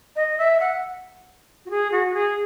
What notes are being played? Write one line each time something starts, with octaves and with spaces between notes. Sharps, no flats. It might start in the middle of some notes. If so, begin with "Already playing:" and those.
D#5
E5
F#5
F#4
G#4
F#4
G#4